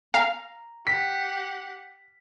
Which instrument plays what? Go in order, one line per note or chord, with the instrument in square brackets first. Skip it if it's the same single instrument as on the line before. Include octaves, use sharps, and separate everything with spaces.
[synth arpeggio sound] F5 [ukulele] A#5
[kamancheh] G4 F#5 [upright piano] B6